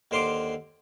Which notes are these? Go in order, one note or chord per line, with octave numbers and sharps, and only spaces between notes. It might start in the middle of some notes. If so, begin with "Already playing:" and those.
D#2 D3 C5 F5 C6 D6